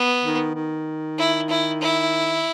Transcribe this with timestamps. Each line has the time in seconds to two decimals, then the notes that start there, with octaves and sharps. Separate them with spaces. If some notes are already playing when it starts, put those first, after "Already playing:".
Already playing: B3
0.23 D#3
0.55 D#3
1.18 E4
1.49 E4
1.81 E4